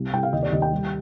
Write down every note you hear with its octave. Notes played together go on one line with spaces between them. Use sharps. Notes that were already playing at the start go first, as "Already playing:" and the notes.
Already playing: C2
C2 G5
F5
D#2 D#5
D5
D#2 D#5
G5
G3